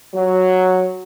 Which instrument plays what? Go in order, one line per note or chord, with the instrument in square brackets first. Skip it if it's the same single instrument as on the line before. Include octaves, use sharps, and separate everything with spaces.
[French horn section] F#3